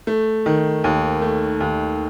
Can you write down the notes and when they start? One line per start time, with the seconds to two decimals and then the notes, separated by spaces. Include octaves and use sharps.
0.07 A3
0.46 D#3
0.84 D#2
1.22 A3
1.60 D#2